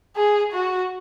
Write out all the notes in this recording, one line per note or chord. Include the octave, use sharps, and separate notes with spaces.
G#4
F#4